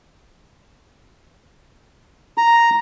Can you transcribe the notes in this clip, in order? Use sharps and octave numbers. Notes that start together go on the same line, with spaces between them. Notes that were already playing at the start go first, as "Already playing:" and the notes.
A#5